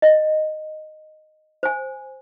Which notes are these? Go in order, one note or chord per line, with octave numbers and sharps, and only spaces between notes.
D#5
C5 G#5